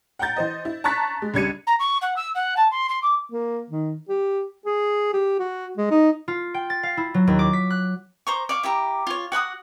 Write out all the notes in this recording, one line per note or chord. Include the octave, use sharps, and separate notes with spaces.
F#5 G5 A#5 G6 A6
E3 C5 D#5
E4
A5 A#5 C#6 F#6 A6 B6
G#3
C#2 G3 D4 G#6 C#7 D#7
A#5
C#6
F#5
E6
F#5
A5
C6
C6
D6
A#3
D#3
G4
G#4
G4
F#4
G#3
D#4
F4
G5
A6
F5
E4
F#3
D#2
D6
B6
F#6
C5 A#5 C#6
D5 F5 C#6
E4 G4 A#5
F4 C#5
F#4 F#5 B5 D#6